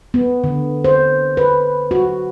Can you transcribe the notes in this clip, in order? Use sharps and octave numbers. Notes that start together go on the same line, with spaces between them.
B3
D3
C5
B4
F#4